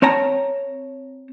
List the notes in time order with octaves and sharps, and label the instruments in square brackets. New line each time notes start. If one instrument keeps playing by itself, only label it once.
[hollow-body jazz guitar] C4 C#5 A5 A#5